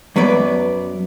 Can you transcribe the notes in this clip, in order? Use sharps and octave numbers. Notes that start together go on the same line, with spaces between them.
F#2 F#3 B3 B4 D5